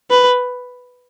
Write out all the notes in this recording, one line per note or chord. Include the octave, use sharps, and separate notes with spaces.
B4